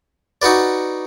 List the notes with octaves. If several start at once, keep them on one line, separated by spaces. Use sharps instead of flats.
D#4 F#4 B4 D5